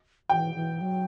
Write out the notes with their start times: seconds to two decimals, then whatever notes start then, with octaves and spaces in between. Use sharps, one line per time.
0.30 E3 G5
0.55 E3
0.81 F#3